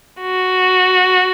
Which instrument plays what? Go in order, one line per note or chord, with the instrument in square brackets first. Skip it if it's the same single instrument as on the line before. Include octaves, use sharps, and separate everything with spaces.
[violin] F#4